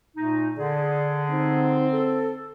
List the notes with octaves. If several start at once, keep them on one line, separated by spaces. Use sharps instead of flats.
A#2 A3 D#4
D3 G#4 D5
C4 D#4
A4